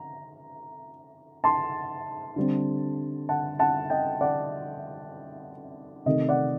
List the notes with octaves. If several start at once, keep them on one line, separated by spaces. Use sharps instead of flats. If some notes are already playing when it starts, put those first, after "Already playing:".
Already playing: A#5
A5 C6
D3 G3 C4
F#5 A5
F#5 A5
D#5 G5
D5 F#5
C3 D#3 A3 D#5
D5 F#5